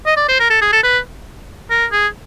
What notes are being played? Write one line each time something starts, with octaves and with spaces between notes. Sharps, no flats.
D#5
D5
C5
A#4
A4
G#4
A4
B4
A#4
G#4